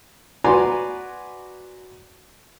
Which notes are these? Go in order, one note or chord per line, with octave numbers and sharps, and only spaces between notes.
F#4 B4 D5 G#5 A#5 C6